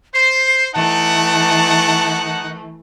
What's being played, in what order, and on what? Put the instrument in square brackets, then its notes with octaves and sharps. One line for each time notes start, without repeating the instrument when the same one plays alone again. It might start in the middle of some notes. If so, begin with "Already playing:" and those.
[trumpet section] C5 [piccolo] C7
[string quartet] E3 A3 [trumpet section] D#4 F#5 [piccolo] A5